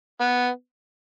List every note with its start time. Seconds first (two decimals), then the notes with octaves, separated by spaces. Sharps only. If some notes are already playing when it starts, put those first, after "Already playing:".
0.21 B3